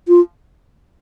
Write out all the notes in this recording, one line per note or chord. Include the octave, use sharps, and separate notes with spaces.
F4